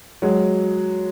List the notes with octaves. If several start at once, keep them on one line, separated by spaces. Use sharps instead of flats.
F#3 G#3